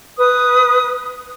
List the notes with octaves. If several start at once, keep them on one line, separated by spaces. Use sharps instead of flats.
B4 D#6